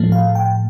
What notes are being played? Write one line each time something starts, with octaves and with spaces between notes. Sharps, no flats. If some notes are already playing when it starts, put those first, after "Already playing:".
Already playing: A2 F3 A3
F5
G5